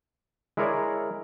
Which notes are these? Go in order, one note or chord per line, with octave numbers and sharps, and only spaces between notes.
G#3 E4 G#4 A#4 C#5 D5